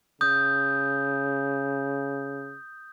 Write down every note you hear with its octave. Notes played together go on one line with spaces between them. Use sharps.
C#3 D#6 G6